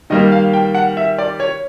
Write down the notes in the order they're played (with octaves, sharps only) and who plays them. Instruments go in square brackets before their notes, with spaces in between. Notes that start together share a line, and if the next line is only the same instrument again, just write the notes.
[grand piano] D#3 G3 A#3 D#5
F5
G5
F#5
E5
D5
C#5